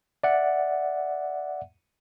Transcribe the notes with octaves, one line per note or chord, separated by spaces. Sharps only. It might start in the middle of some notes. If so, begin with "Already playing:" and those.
D5 E5 F#5